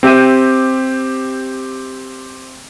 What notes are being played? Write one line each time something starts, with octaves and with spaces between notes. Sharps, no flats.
C4 G4 E5 G5 D#7